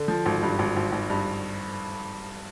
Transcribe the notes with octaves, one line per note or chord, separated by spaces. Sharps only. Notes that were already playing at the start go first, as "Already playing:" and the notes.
Already playing: D3
F3
G#1
G2
G#1
G#1
G#1
G2